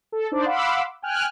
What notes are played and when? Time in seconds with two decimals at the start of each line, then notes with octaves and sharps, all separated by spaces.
0.12 A4
0.32 D4 D#4 C5 D5
0.46 F5 F#5 B5 C6 D6 E6
1.02 G5 G#5 F6 F#6